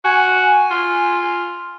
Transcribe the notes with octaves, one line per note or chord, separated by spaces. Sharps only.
F#4 G#5
F4